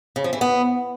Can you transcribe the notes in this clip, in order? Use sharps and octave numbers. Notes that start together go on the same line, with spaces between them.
C#3
F3
E3
B3